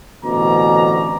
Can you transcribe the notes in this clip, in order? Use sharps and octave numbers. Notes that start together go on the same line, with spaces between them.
A1 B2 D3 C4 D5 A#5